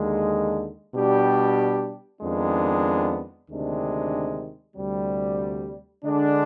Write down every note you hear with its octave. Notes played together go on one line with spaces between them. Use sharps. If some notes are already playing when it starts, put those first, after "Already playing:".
Already playing: D#2 D3 G#3
B2 G3 D4 G4
F2 D#3 G#3 B3 D4
D2 C3 D#3 G#3 D4
D2 C3 G3
D3 G#3 D4